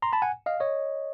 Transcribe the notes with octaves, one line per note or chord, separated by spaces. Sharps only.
A#5 C6
A5 B5
F#5 G#5
D#5 F5
C#5 D#5